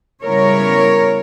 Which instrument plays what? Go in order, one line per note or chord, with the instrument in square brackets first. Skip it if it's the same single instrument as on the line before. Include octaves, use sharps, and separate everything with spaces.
[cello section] C#3 G3 B3 E4 A#4 C#5